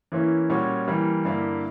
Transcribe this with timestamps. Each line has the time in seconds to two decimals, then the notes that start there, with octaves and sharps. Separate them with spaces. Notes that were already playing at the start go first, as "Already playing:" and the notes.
0.12 E3 A#3 C#4 E4
0.50 A#2 G3 C#4 F#4
0.88 E3 G3 A#3
1.25 G2 D3 A#3 E4